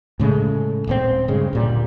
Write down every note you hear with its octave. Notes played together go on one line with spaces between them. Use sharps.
A2 C#3 G#3 A3
D#1 A2 C4
G2 C#3 G#3
D1 A#2 G3